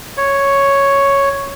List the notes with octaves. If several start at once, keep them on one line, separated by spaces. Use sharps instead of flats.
C#5